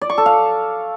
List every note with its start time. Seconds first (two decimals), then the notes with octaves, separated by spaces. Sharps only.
0.01 D5
0.10 C#6
0.18 A4
0.26 F5